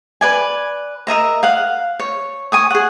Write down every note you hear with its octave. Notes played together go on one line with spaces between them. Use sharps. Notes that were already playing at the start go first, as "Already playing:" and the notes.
B4 D5 G#5
A#4 D#5 E5 A#5
F5 F#5
C#5
G#5 C#6 D#6
G#4 F#5